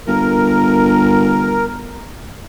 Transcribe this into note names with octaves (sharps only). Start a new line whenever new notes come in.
G1 A#4